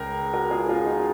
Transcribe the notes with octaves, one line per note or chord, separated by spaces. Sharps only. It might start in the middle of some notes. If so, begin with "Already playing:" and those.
Already playing: C#2 A#4
F#4 A#4
F4 G#4
F4 G#4
D#4 F#4